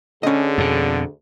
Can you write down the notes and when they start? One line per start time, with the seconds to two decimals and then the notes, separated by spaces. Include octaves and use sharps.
0.23 D2 D3 C#4 G#4 D#5
0.58 F2 B2